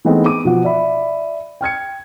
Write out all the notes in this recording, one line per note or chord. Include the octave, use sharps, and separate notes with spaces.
E3 G#3 A3 B3 C4 D#4
D6 D#7
B2 F3 F#5
D5 E5 B5
G5 F6 G#6 C#7